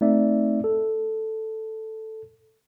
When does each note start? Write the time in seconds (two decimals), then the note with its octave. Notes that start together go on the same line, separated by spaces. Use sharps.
0.01 A3 C4 D#4 D5 E5
0.64 A4